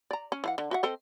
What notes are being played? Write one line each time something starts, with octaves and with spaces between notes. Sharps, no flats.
D5 A#5
C#4
E3 F5 F#5
D3
F#4 E5 F#5
C4 A4 D#5